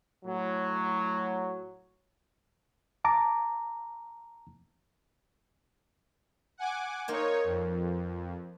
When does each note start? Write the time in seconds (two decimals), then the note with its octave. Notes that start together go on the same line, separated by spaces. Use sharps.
0.25 A2 F#3
3.05 A5 A#5 D6
6.58 F#5 G#5 D6
7.08 A#3 D#4 C5 C#5 G#5
7.44 F2